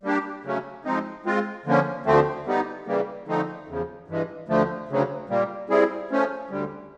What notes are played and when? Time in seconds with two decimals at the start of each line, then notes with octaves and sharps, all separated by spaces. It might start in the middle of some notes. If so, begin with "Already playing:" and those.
0.03 G3 A#3 D4 G4
0.44 C#3 F#3 A3 C#4
0.84 F3 G#3 C4 D#4
1.26 G#3 C4 F4
1.66 D3 F3 A#3 C#4
2.06 D2 D3 F3 A3 C4
2.46 G3 B3 D#4
2.87 C#3 E3 G3 A#3
3.28 D3 F3 A3 C4 D#4
3.68 E2 C#3 F3
4.08 G2 E3 G#3
4.48 D2 D3 F3 A3
4.89 D2 C#3 F#3
5.29 A#2 G3 A#3
5.69 G3 C4 E4 G#4
6.10 F3 A3 C#4
6.50 D2 D3 G3